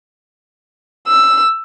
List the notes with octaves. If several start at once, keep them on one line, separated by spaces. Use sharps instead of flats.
E6